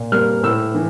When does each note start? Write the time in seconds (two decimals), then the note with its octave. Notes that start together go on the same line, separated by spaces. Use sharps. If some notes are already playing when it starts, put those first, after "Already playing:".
Already playing: A#2
0.12 G3 A#3 F6
0.43 A2 E6
0.75 E3